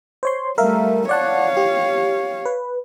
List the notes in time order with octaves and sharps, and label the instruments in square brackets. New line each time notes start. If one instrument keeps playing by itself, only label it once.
[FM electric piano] C5 C#5 C6
[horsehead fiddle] G3 A3 [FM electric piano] A#4 E5 F5
[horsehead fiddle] C#5 F5 [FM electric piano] D5 F#5 A5
[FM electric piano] G4
B4